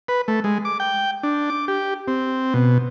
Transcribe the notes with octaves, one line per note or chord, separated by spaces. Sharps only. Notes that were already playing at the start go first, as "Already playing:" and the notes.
B4
A3
G#3
D6
G5
D4
D6
G4
C4
B2